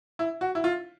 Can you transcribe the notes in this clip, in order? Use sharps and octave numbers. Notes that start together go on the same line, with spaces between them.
E4
F#4
E4
F4